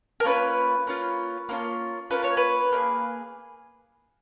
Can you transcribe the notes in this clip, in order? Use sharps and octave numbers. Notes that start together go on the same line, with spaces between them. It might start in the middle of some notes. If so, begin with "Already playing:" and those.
A#4
A#3 C#4 F4 B4
A#3 C#4 F4
A#3 C#4 F4
A#3 C#4 F4 B4
C#5
B4
A#3 D#4 G#4